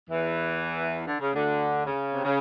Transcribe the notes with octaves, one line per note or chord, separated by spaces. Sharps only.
E2 E3
D3
C#3
D2 D3
C#3
C3
C#3